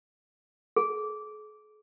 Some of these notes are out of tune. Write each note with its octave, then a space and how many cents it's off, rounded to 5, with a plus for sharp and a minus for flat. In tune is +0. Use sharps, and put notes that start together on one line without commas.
G#4 +45